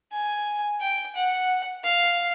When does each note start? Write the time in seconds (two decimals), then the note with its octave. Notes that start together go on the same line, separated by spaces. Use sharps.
0.12 G#5
0.81 G5
1.15 F#5
1.84 F5